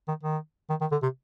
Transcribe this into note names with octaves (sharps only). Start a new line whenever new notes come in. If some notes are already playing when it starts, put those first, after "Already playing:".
D#3
D#3
D#3
D#3
D3
C3